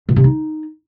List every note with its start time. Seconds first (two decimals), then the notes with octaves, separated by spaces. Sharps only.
0.09 B2
0.16 C3
0.24 D#4